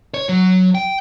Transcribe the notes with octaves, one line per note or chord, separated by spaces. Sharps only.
C#5
F#3
G5